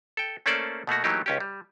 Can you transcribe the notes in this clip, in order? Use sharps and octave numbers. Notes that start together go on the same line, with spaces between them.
A4 G5
A3 A#3 C#4 A4 C5 D5
B2 A3 A#3 F#4
E3 F#3 A3 A#3 D#4 G4
C#2 C#4 G4
G3